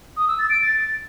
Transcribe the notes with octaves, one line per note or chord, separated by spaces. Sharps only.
D#6
E6
A6
D7
A6